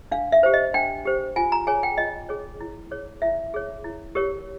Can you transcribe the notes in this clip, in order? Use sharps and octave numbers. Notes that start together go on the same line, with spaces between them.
D4 F5
E5
G4 C5
D#5
D4 G5
G4 C5
F4 G#5
A#5
G#4 C#5 G#5
G5
F4 D#5
G#4 C#5
E4
G#4 C#5
E4 E5
G#4 C#5
E4
G4 A#4 C#5